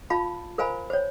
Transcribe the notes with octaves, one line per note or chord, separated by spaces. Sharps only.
F4 F5 A5 B5
A#4 C5 F5 G#5 A#5 B5
C5 C#5